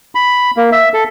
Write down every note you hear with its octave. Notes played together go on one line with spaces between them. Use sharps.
B5
A#3
E5
A4